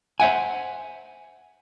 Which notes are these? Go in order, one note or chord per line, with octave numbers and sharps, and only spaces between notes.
C5 E5 F#5 G#5